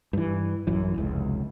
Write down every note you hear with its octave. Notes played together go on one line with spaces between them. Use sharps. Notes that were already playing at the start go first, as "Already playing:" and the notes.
G2 E3
A1 F#2 E3
F1 C#2